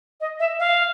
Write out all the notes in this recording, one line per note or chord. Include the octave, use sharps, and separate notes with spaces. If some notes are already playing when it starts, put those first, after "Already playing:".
D#5
E5
F5